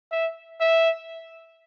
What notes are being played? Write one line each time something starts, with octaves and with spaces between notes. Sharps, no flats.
E5
E5